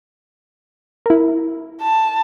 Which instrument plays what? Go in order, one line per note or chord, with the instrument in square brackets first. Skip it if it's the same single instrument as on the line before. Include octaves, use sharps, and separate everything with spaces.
[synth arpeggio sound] E4 A#4
[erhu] A5